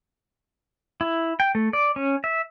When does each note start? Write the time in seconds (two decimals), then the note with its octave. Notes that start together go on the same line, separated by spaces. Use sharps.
1.01 E4
1.40 G5
1.55 A3
1.73 D5
1.96 C#4
2.24 E5